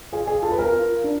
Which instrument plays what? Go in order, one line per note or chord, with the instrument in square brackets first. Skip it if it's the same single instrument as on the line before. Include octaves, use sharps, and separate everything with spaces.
[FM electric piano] F4 [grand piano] G#4
[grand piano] G#4
[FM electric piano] F4 [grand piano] A4
[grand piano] B4
A#4
[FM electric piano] F4
D4